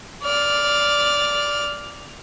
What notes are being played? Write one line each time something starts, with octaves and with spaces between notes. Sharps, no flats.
D5 F6